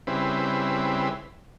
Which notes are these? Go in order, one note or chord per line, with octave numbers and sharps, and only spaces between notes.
C#3 G3 C4 E4 B4